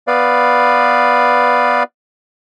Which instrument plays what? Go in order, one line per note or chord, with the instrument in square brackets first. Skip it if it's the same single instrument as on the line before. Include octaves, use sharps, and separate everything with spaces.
[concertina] B3 B4 D5 F5